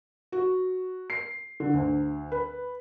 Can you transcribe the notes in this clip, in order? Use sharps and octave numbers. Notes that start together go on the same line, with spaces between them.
F#4
C7
D3
D2
B4